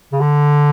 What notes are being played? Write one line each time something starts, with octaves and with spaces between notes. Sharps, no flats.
C#3
D3